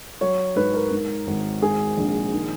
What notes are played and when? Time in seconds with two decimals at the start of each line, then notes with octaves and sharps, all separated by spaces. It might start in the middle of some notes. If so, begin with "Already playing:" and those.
0.21 F#3 C#5
0.56 G#2 B4
0.74 A#4
0.91 G#2
1.27 G#1
1.62 G#2 G#4
1.97 A#1
2.33 D#3